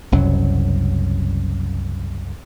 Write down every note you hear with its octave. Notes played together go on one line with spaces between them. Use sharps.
F#1 C2 F#2 F#3